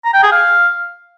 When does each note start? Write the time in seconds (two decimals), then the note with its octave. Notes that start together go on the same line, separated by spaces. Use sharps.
0.05 A#5
0.14 G5
0.23 G#4
0.32 F5